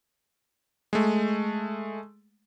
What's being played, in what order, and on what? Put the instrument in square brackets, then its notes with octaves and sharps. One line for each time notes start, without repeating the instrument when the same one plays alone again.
[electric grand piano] G#3 A3